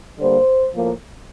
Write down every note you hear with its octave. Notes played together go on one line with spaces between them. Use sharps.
D3 G3 A#3 C5
A2 F3 A#3